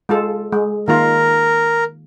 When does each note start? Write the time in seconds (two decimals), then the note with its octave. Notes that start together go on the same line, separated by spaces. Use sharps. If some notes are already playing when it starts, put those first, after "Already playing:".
0.09 G#3 F4 A4
0.53 G#3
0.88 D#3 A#3 F4 A#4